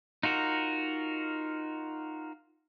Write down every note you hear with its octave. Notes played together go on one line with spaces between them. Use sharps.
D#4 F4 F#4 A#4